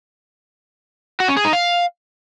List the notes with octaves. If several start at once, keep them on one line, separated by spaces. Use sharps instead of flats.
F#4
C#4
G#4
D#4
F5